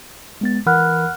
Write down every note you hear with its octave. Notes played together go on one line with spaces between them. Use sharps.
G#3 B3 A6
E3 A#4 F#5 B5 F6 F#6